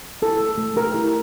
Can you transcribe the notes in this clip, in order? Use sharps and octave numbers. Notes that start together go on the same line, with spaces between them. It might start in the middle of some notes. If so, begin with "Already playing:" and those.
E4 A4
A3
A3
G4 A#4
E4